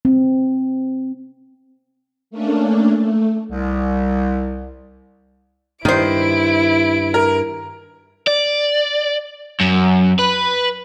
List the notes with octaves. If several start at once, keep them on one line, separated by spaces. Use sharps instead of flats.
C4
A3 A#3 C#4 D4
A3
C2
G2 D#3 E4 C5 D7
A#4
D5
F#2
B4